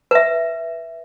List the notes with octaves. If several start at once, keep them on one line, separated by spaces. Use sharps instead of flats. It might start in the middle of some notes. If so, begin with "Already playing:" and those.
B4 E5